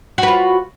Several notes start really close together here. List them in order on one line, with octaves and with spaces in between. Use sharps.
F#4 B4 F4